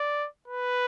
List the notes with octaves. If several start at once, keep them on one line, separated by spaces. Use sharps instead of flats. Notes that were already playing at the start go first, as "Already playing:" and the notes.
Already playing: D5
B4